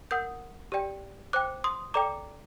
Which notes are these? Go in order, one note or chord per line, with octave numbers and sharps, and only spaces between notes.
A#4 F#5 D#6 G6
G4 D5 G5
C5 G5 D6 F#6
C6 D#6
A4 D5 G5 A#5 D6